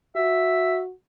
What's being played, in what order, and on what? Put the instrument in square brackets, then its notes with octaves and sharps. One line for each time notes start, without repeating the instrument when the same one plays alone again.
[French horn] F#4 [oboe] E5